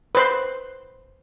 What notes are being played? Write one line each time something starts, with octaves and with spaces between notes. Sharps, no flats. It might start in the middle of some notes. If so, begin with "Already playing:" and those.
B4 C5 C6